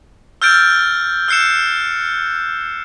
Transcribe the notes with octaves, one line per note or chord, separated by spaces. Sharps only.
E6 F6 G6 A6 D7
E6 F#6 C7 C#7 E7